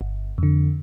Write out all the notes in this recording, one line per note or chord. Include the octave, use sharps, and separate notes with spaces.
G1
F2 D3